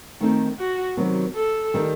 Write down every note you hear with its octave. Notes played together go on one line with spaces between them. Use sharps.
D#3 A3 C4 D#4
F#4
C3 D#3 F#3 B3
A4
D#3 G3 D#4 G4